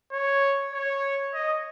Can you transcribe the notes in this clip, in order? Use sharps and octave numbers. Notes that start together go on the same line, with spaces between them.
C#5
C#5
D#5